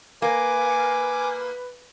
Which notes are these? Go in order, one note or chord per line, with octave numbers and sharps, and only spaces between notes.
A#3 B4 G#5 D6